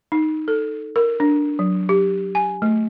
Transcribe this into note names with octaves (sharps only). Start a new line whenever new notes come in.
D#4
A4
A#4
D4
F#3
G4
G#5
A3